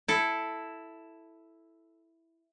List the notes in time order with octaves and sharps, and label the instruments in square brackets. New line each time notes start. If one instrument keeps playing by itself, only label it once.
[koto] E4 A4